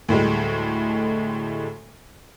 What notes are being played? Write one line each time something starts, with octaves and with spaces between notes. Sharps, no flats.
D2 A2 G3 G#3